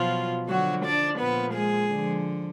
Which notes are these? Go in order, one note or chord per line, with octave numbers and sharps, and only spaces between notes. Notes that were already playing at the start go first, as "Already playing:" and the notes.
Already playing: B2 F3 F#3 F4
D3 F3 F#3 F#4
D4 D5
A#2 F3 B3 B4
G#3 G#4
D3 F3